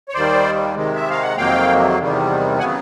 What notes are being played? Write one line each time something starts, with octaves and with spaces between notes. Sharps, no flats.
C#5
D#2 D#3 G3 C5 D5
C3 D#3 G#3
E5
F5
F#5
F2 C3 D#3 F#3 A#3 F5 G5
E2 C3 D#3 G3
C#3 F#3 B3 F#5 G#5